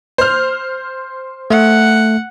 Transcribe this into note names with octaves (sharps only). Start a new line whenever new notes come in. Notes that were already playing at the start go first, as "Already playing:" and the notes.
C5 F6
A3 F#5